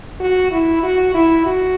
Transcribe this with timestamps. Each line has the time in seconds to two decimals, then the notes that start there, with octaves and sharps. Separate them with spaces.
0.20 F#4
0.51 E4
0.83 F#4
1.14 E4
1.46 F#4